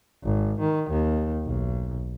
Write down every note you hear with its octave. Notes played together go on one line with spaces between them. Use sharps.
G#1
D#3
D#2
B1